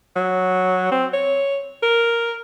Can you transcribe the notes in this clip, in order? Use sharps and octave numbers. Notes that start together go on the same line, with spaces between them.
F#3
C4
C#5
A#4